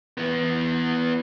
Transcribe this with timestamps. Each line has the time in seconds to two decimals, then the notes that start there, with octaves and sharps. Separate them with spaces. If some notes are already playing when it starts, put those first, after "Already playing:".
0.17 E3 B3